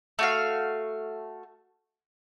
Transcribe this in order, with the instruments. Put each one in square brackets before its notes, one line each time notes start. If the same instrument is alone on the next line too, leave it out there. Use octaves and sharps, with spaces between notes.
[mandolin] A3 F#4 F5